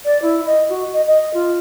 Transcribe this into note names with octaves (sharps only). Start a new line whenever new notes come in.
D5
E4
D#5
F#4
D#5
D#5
F4